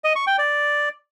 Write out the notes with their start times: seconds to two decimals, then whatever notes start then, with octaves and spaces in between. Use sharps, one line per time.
0.04 D#5
0.16 C#6
0.27 G5
0.38 D5